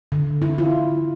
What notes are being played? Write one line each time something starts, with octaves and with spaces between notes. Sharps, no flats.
D3
E4
F4